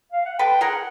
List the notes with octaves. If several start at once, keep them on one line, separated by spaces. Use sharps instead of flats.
F5
F#5
A4 B4 G5
G#4 A#4 F#5